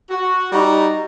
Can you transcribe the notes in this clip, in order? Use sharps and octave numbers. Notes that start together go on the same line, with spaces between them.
F#4
G3 D#4 F#4 A#5